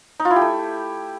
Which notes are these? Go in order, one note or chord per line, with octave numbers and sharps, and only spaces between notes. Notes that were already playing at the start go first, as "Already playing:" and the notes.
D#4
F4
E4
G4
A3